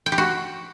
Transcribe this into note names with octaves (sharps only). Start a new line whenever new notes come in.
G5
G4
F#4